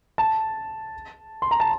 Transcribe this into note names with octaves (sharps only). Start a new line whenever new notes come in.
A5
C6
A#5
A5